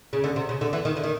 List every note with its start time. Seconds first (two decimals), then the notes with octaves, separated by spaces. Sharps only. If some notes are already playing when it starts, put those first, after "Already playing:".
0.13 C#3
0.24 D3
0.36 C3
0.49 C#3
0.61 D3
0.73 E3
0.85 D#3
0.97 D3
1.04 D#3